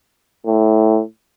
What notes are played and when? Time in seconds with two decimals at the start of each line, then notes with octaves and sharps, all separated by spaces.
0.46 A2